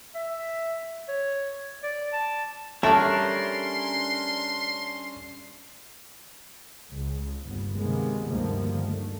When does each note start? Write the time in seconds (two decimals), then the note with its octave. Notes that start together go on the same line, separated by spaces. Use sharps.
0.15 E5
1.08 C#5
1.83 D5
2.13 A5
2.83 G3 A3 C#4 D4 A#4 A5 C6
6.92 C#2
7.43 G1 D#2 B3
7.78 C3 D#3 G#3 A#3 B3
8.30 D2 G2 D3 D#3 F3 A#3
8.84 A3